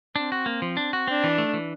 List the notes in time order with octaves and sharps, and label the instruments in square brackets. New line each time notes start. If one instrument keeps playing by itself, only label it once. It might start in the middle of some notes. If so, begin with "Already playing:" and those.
[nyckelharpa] C4 [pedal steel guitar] D4
[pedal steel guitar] F#4
A#3
F3
D4
F#4
[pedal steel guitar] C4 [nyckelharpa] D4
[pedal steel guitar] E3
A3
E3